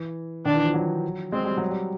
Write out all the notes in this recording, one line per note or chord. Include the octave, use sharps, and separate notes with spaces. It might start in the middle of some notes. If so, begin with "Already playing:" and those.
Already playing: E3
D#3 D4
E3
F3
F#3
G#3 C4
G3
F#3
G3